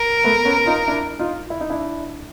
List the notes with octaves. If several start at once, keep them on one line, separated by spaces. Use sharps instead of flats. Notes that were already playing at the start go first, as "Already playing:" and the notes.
Already playing: A#4
A3 B3
B3 C#4
D#4 F4
D4 E4
D#4 F4
E4
D#4
D4 E4